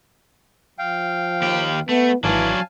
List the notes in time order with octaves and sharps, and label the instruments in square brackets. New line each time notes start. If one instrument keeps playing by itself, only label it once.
[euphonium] F3 [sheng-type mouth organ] F5 G5
[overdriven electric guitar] D#2 G4
[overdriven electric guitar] A3 [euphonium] B3
[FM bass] G#1 [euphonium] E3 [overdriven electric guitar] F#3 D4 [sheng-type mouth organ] F5 G#5 A5